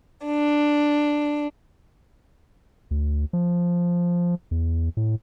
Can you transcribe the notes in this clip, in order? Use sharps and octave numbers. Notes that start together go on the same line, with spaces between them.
D4
D2
F3
E2
A2